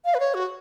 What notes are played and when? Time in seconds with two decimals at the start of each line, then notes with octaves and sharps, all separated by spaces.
0.05 F5
0.14 B4
0.20 C#5
0.34 F#4